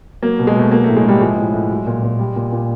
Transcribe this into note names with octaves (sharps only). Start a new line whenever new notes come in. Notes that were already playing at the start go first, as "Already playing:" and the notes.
F#3 A#3
B2
G#3
B2 A3
F#3 A#3
A2 A3
G#3
A2 G3
F3 G#3
A2
A2
F#3
A#2
A#2
G3
A#2
A#2